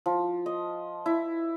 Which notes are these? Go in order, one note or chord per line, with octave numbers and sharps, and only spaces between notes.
F3
D#5
E4